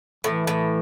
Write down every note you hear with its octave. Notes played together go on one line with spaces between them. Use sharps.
A2 E3
A2